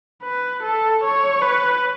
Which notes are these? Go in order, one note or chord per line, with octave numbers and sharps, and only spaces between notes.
B4
A4
C#5
B4